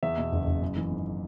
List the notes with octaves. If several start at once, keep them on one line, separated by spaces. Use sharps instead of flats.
E2 E5
B2
F#1
F#1
F#2
E3
G#1